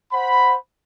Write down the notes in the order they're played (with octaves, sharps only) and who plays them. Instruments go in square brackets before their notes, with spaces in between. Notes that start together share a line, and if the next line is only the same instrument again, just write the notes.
[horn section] C5 F#5 B5